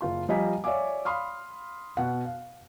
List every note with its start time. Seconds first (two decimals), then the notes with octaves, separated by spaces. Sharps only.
0.01 F#1 F4 C6
0.29 F3 G3 D#5 G#5 A#5 B6
0.64 C#5 D5 E5 F5 G#5 D6
1.05 F5 B5 C6 D#6 F6
1.97 B2 F#5
2.25 F5